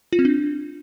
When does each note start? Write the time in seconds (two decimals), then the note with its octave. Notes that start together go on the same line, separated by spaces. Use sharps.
0.13 F4
0.19 C4
0.25 D4